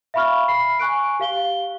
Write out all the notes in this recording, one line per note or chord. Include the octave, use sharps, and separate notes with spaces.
E5 F5 B5 C#6 F6
B5 C7
G#5 C#6 F#6 D7
G4 F5 G7